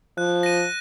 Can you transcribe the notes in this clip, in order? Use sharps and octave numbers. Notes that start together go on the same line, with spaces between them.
F3 F#6
A#6 D#7